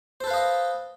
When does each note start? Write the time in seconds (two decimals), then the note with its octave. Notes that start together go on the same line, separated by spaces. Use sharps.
0.20 C5
0.24 A4
0.27 B4
0.30 F5
0.34 D#5